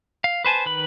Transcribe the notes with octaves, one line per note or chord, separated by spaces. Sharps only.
F5
B4 C5 G#5 A5
D#3 B4 B5